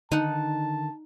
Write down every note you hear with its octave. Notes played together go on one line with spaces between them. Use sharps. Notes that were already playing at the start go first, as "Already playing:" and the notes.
D3 D#3 D#4 F#5 A5